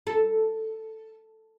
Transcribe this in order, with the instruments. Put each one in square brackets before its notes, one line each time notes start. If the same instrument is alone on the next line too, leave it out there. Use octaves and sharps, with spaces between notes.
[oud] A4